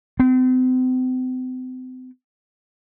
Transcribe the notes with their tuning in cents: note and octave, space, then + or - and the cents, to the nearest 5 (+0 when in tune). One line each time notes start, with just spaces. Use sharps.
C4 -40